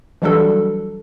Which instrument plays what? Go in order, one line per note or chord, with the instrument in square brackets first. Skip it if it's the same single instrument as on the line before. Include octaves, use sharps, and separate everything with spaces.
[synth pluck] E3 F#3 G3 D4 F#4 A4